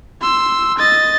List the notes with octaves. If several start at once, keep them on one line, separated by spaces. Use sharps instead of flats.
C6 E6
D#5 A6